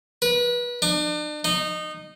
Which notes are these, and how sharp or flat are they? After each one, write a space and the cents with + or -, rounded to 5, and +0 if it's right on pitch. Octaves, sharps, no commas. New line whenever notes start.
B4 -30
D4 +40
D#4 -20